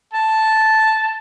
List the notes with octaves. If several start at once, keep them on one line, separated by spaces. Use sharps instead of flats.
A5